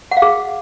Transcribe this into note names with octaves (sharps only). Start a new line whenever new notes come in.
F#5
F5
G#4